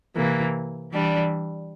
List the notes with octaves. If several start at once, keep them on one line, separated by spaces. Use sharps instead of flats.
C3 E3 A#3
E3 G3 D4